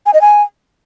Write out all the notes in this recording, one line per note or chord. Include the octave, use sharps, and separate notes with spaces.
G#5
D#5
G#5